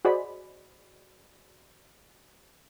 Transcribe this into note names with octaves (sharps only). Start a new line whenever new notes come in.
F#4 G#4 C5 D5 D#5 B5